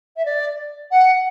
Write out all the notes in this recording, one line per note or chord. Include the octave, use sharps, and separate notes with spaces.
E5
D5
F#5